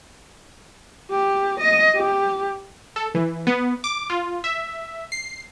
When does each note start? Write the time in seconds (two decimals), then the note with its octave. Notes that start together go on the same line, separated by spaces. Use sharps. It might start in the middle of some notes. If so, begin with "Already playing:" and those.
1.11 G4
1.60 D#5
1.96 G4
2.96 A4
3.15 E3
3.47 B3
3.84 D6
4.10 F4
4.44 E5
5.12 C7